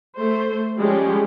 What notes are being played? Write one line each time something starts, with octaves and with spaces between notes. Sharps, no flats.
A3 C5
F3 G3 G#3 C#4 G4